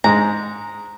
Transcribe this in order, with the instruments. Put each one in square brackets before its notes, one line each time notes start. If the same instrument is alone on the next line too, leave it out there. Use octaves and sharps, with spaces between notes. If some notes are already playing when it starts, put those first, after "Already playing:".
[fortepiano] G#2 G#3 [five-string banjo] A#5